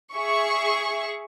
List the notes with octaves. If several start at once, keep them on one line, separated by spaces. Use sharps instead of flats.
G#4 E5 C#6